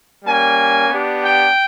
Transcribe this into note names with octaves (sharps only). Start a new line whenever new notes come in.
G3 A#3 C#4 G#5
B3 D4 G4
G5